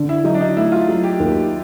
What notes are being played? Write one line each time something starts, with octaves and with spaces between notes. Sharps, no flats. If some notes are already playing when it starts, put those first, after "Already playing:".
Already playing: D3
E4
F#3 D#4
D4
D#4
A3 E4
F4
F#3
G4
D#2